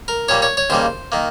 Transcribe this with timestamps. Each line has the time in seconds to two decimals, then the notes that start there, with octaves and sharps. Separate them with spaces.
0.08 A#4
0.29 A#2 G3 A#3 C#5
0.42 C#5
0.57 C#5
0.70 D#2 C#3 G3 A#3 C5
1.12 D#3 A#3